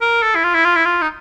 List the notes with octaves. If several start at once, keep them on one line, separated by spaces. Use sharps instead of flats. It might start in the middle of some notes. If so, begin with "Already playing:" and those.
A#4
A4
E4
F4
E4
F4
E4
F4
D#4